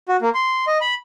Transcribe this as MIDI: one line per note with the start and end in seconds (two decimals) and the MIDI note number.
0.08 0.17 66
0.22 0.29 58
0.34 0.65 84
0.67 0.78 75
0.81 0.94 83